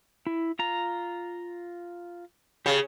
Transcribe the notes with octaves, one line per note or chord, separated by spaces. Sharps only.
E4
F4 A#5
C#3 G4 C#5 A5